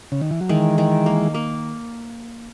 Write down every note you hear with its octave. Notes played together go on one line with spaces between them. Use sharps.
C#3
D#3
E3
F#3
D#3 E3 G#3
D#3
A#3
A#3